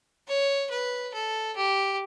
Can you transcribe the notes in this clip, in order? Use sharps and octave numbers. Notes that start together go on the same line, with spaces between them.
C#5
B4
A4
G4